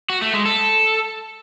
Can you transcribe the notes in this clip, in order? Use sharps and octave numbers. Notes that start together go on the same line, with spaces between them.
F#4
A3
G#3
A4